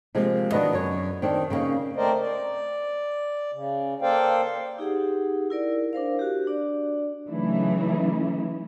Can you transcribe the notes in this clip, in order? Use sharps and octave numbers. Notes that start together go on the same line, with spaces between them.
C3 F3 G#3 A#3
D#3 B3 D4 F#4 B4 D#5
F#2 C#5
D#3 C4 D4
C#3 A#3 B3 C#4 D#4
A3 C4 A#4 C5 D5 D#5
D5
C#3
A#3 A4 C5 D5 F5 G5
D#4 G4 G#4 F#5
E4 A#4 D5
D4 A#4 C5 F5
F#4 G4
D4 D5
C#3 E3 F#3 A3 D#4 E4